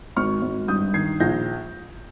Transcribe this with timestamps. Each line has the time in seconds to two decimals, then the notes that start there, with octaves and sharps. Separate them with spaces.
0.17 G#1 C#6 F6
0.42 G#1
0.68 G2 D#6 G6
0.94 D#3 G#6 C7
1.20 A#1 G6 A#6